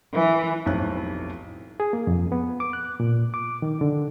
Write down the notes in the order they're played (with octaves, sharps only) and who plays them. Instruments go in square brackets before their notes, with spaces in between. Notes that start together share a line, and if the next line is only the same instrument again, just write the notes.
[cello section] E3
[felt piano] F1 B1 A2 C5 F#6
[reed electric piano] G#4
A#3
F2
B3
D6
F#6
A#2
D6
D#3
D3